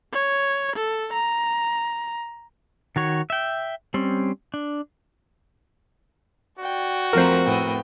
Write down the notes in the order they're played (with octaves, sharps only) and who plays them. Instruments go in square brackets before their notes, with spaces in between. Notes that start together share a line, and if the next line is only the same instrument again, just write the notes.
[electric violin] C#5
A4
A#5
[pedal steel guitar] D#3 F#4 C#5
E5 G5
G3 C4 C#4
D4
[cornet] F#4 [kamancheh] D5 G5
[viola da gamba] F2 F3 A3 [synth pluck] A#4 C5
[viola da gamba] A2 [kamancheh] B3 G5